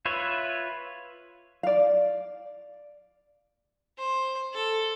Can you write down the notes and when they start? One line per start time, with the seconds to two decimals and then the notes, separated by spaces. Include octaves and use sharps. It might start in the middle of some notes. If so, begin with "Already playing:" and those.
0.06 F4 B4 C#5 E5
1.63 D5 F5
3.98 C5
4.54 A4